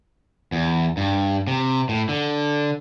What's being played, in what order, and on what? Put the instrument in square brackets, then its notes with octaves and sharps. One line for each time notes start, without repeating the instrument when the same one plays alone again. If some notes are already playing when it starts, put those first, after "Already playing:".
[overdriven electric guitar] E2
G2
C3
A2
D3